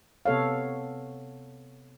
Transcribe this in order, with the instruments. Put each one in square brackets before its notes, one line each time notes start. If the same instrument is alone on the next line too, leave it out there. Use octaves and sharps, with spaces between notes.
[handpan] C3 B3 A4 C#5 F5